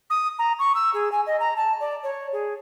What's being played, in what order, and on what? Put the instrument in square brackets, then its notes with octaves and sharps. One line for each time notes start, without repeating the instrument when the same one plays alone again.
[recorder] D#6
A#5
C#6
E6
G#4
G#5
D#5
A#5
A5
D5
C#5
G#4